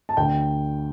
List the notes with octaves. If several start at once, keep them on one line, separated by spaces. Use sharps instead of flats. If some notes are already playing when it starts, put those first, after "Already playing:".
A5
D2 G5